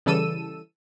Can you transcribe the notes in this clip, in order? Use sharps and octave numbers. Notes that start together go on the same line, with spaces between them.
C#3 E3 G3 A4 E6 D#7